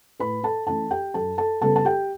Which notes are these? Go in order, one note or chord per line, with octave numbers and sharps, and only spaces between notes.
A2 B4 B5
A4 A5
E3 A3 C#4 A4 A5
G4 G5
F#2 A4 A5
A4 A5
C#3 G3 B3 A4 A5
A5
G4 G5